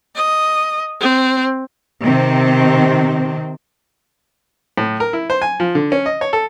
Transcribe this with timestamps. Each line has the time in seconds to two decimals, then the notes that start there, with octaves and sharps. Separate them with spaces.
0.16 D#5
1.01 C4
2.04 C3 D#3 C4
4.78 A2
5.00 A#4
5.13 E4
5.30 C5
5.42 G#5
5.60 F3
5.75 D3
5.92 C#4
6.06 D#5
6.21 C#5
6.33 A4